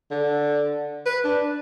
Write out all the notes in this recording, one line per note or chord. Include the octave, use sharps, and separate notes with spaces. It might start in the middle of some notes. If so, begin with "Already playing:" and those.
D3
B4
D4